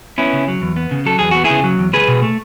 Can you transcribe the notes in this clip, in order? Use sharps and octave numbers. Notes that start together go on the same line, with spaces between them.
B3 C#4 E4
C#3
F#3
E2
B3
C#3
F#3 A4
E2 G#4
B3 F#4
E4 G#4
C#3
F#3
E2
C#2 G#4 B4
B2
A3